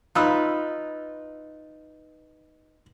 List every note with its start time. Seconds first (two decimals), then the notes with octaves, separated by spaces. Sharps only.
0.15 D#4 F4 B4 E6